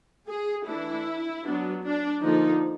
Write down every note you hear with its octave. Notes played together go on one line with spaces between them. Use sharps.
G#4
E3 A3 D4 E4
F#3 B3 D4
D4
D3 F3 A#3 D#4